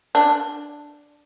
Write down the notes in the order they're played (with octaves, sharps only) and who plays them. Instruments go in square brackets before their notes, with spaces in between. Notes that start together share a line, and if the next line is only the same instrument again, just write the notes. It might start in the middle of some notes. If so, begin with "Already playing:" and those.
[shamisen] D4